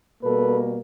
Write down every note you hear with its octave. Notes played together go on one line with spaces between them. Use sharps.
B2 G3 A#3 A4 B4